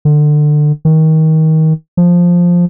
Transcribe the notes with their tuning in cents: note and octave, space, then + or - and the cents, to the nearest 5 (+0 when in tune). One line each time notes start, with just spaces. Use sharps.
D3 +25
D#3 +25
F3 +5